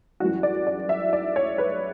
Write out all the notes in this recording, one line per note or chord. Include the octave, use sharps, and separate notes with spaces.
F#2 E3 G3 F#4
D5
D5
E5
D5
C#5
B4